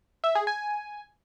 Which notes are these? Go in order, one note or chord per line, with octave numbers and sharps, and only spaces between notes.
E5
G#4
G#5